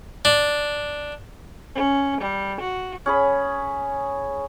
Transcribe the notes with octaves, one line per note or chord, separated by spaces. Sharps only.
D4
C#4
G3
F#4
C#4 G#4 B5